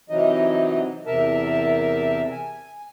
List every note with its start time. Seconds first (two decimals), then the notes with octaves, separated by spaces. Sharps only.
0.10 C3 E3 F#3 D#4 D#5
1.06 E2 C3 A#4 E5 A5
2.32 G#5